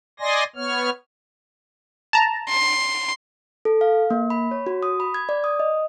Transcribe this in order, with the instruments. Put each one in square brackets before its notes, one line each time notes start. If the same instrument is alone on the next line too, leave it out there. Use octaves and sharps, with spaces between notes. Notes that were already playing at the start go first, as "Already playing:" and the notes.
[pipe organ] D5 D#5 G#5 C6 A#6
B3 C#5 F6
[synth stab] A5 A#5
[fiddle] C6
[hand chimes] A4
F5
A#3
B5
C#5
F#4
D#6
B5
G#6
D5
D#6
D#5